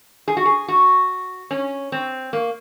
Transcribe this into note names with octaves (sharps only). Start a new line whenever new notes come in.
G#4
F#4
G#4
F#4
C#4
C4
A#3